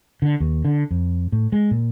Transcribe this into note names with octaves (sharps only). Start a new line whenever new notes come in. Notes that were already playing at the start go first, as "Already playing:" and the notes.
D3
D#2
D3
F2
A2
G#3
A#2